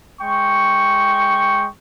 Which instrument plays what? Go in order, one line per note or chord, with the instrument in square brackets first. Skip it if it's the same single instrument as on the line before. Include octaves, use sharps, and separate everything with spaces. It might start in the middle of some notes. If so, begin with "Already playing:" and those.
[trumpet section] G#3 G5 C#6